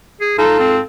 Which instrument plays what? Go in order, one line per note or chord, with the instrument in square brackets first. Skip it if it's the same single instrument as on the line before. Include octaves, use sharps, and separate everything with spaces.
[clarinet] G#4
[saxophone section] G#2 F4 A4 [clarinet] D#4
[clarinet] C4